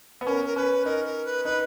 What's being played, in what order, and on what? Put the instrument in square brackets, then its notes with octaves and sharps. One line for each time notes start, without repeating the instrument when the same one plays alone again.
[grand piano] B3
[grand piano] C#4 [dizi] A#4
[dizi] A#4
[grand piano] C#4 [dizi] B4
[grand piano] D#4 [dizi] A#4
[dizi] A#4
B4
[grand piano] D#4 [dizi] B4